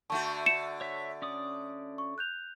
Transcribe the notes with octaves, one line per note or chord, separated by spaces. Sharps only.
D3 A3 F#4 A5 C#6
C#7 E7
C#5 E5
C#4 D5 D#6
C#6
F#6 G6 F7